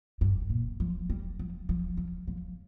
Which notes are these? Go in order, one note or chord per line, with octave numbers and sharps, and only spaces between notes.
G2
A#2
F3
G3
F3
F3
F3
F3